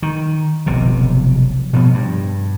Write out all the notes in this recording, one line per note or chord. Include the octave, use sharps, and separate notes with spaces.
D#3
F1 B1 C3
B2 F3 B3
G2